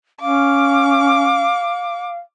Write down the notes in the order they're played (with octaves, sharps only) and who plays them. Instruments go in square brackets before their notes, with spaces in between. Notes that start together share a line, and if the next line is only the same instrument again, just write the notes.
[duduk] C#4 [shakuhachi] F5 [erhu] D6